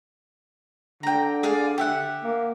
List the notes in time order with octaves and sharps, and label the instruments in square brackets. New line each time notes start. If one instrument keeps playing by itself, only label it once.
[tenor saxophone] D3 [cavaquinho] G5 A#5
[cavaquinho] G#4 D5 F5
G4 E5 F#5
[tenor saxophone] A#3